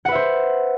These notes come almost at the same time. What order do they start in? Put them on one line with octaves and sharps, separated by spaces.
F#5 B4 E5 C5